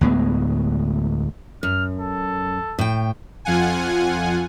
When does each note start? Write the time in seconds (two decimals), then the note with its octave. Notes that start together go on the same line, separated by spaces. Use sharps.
0.01 D2 A2 G#3 B3
1.63 F#2 F6
1.99 A4
2.79 A2 G5
3.45 F2 F4 F#5 G#5